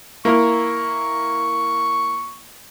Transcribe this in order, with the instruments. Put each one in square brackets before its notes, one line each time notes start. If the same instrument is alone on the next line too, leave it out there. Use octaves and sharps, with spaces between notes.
[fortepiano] A#3 E4 A#4 [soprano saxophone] C#6